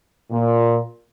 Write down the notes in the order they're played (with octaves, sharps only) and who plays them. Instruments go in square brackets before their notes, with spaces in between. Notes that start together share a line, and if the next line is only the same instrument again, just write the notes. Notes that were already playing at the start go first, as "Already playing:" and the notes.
[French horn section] A#2